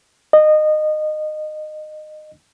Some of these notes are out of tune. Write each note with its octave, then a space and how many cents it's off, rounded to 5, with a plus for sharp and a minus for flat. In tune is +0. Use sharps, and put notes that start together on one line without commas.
D#5 -20